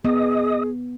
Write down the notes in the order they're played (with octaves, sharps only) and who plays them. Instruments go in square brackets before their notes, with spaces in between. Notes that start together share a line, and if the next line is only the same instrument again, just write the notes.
[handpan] B3 [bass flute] G#4 [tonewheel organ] D#5 D#6